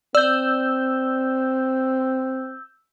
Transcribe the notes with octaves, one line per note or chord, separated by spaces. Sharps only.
C4 D5 E6 G6